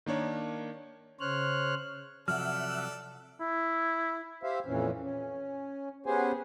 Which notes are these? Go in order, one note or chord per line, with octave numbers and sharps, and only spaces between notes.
D#3 A#3 D4 C#5
C#3 C5 C#5 F6 F#6
C3 F3 F#3 A4 D5 E5 F#5 F6
E4
G4 C5 E5 F5
F2 A#2 E3 C#4
C#4
B3 C#4 G4 G#4 C5 G#5